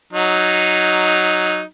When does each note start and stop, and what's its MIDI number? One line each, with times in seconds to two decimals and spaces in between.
0.13 1.61 54
0.13 1.61 63